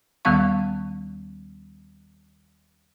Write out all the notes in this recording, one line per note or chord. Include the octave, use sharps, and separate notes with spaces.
D#2 D#3 G3 B3 F5 C#6